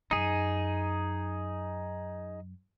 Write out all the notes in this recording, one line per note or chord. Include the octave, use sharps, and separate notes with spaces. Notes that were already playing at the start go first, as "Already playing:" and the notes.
F#2 D#4 G#4